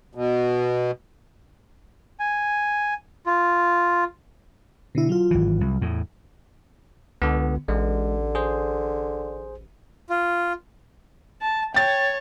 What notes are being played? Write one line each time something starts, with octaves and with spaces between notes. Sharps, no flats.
B2
G#5
F4
B2 D3 E4
F#3 F4
G#1 E3
C2
E2 A2
C#2 D3 B3
A1 D3 G#3
G#4 C5
F4
A5
C#5 G5 A6